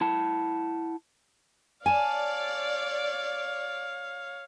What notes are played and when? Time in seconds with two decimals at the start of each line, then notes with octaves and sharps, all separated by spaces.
0.01 E4 F#5 A5
1.86 C#5 D5 F5 G#5 A5